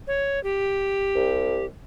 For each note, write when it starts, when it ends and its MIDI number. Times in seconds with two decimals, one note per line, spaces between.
0.07 0.42 73
0.44 1.65 67
1.16 1.67 36